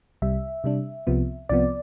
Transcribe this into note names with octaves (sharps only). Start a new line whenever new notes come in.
C2 C3 G3 E5
C3 G3 D4
C2 C3 F3 B3
C2 C3 F3 B3 D5